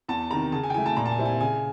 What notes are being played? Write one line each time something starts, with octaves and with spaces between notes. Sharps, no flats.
E2 A5
C3 D#3 A#5
C#3 A5
G#5
G5
E3 A3 G#5
A5
A#2 A#5
A5
G#5
G3 C4 E4
G#5
C#3 G#5